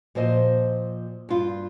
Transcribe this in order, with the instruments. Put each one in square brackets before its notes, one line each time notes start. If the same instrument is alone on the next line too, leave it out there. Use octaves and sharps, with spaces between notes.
[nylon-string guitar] A#2 F3 C5 D#5
G2 F4